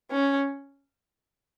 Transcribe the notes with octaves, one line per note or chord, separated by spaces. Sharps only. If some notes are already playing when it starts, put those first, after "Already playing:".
C#4